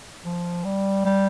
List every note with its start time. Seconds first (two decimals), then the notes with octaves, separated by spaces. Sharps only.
0.24 F3
0.65 G3
1.05 G3